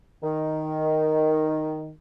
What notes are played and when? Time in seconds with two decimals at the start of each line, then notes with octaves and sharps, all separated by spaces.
0.23 D#3